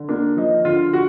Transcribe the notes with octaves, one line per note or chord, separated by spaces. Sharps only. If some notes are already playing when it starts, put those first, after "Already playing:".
Already playing: D3
A#3 D4
F3 D#4
D3 F4
F#4